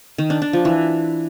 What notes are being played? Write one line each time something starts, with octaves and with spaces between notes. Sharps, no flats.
D#3
D4
D4
F3
E3